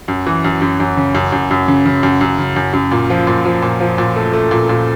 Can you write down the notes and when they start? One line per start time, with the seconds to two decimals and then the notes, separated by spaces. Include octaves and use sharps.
0.08 F#2
0.26 E3
0.44 F#2
0.62 F#2
0.80 F#2
0.97 C#3
1.15 F#2
1.32 F#2
1.51 F#2
1.68 C#3
1.86 C#3
2.03 F#2
2.21 F#2
2.38 C#3
2.56 F#2
2.73 F#2
2.92 A#2
3.10 F3
3.27 A#2
3.45 F3
3.62 A#2
3.80 F3
3.98 A#2
4.16 A3
4.33 A3
4.51 A#2
4.69 A#2